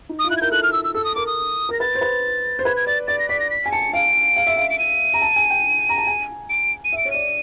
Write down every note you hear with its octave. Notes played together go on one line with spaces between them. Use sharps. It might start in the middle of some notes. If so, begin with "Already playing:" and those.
D#4
D#6
F4
E4 F#6
G#6
A#4 G6
A4 F#6
F6
E6
E6
A4 E6
D#6
A#4 D6
D#6
A#4 A#6
B4 A6
C5
B4
C5
B4 G#6
G#6
D5 A6
D5 A6
A#6
D5 B6
A#6
B6
G#5
A5 C#7
F5 D7
F5
E5
F5
D7
D#7
A#5
A5
G#5
G5
A#5
A5
G#5
D7
D#7
E5
D7
C#5
D5 D#7